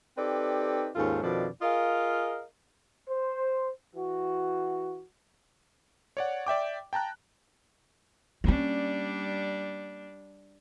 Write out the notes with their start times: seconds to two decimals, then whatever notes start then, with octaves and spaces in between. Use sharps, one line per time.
0.17 C4 D#4 G4 A4 B4 D5
0.96 D#2 G#2 C#4 F4 A4
1.23 F2 B2 D#3 F3 D4 D5
1.62 F4 G#4 A#4 D#5 F5
3.08 C5
3.95 E3 F#4
6.17 C#5 D5 F#5
6.47 D5 E5 G5 D6
6.93 G5 A5 A#5 F#6
8.44 G3 A#3 C#4 D4